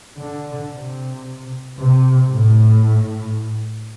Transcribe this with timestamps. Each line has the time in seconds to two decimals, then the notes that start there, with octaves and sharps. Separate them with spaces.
0.18 D3
0.72 C3
1.78 C3
2.30 A2